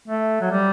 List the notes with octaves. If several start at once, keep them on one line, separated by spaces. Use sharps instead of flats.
A3
F#3
G3